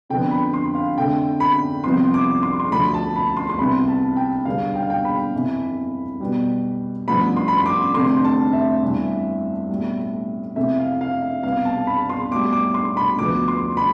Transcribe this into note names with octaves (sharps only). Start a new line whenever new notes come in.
F2 D3 F3 B3 G5
B5
C6
F5
F2 D3 A3 G5
B5
C2 C3 F3 B3 C6
D6
C6
C6
D2 D3 F3 A3 B5
A5
B5
C6
C6
C2 C3 E3 G3 B3 B5
A5
G5
E1 E2 D3 G3 B3 F5
G5
F5
G5
B5
G1 F2 E3
B1 B2 G3 B3
A1 G2 F3 B3 B5
C6
B5
C6
D6
F1 F2 D3 A3 C6
A5
E5
G1 G2 E3
B1 A2 G3
F2 C3 E3 A3 E5
F5
F5
E5
C2 B2 B3 F5
A5
B5
C6
B1 A2 G3 D6
D6
C6
B5
D2 D3 F3 B3 D6
C6
B5